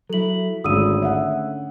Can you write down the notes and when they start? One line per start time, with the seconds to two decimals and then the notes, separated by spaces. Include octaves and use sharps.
0.10 F#3 E4 A4 F#7
0.64 G#1 D3 A3 C#4 D#6 E6 D#7
1.02 E5 F#5